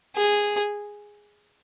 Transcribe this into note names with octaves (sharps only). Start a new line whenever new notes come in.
G#4